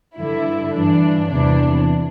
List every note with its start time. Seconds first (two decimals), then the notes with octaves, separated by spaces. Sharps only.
0.17 G2 D3 E4
0.73 G2 E3 D4
1.29 E2 C3 E3 D4